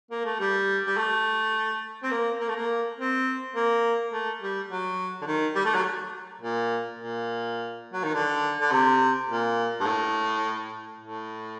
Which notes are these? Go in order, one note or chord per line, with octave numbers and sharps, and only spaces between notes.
A#3
A3
G3
G3
A3
C4
A#3
A#3
A3
A#3
C4
A#3
A3
G3
F#3
D3
D#3
G3
A3
F#3
A#2
A#2
F#3
D#3
D3
D3
C3
A#2
G2
A2
A2